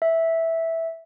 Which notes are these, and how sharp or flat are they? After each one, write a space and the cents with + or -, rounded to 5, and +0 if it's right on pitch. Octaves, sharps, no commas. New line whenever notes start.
E5 -5